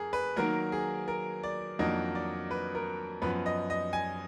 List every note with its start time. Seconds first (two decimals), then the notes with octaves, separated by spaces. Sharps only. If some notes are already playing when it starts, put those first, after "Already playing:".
Already playing: F2 G#4 A#4
0.13 B4
0.36 D#3 F#3 A#3 A#4
0.72 G#4
1.08 A#4
1.43 D5
1.79 F2 D#3 F#3 A#3 D4 D#5
2.15 D5
2.51 B4
2.75 A#4
3.22 F#2 F3 B3 B4
3.46 D#5
3.70 D#5
3.93 G#5